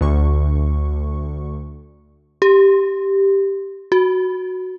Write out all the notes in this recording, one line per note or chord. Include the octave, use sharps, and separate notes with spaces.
D2 D3 C#6
G4
F#4